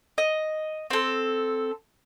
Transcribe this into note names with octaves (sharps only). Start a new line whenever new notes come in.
D#5
C4 A4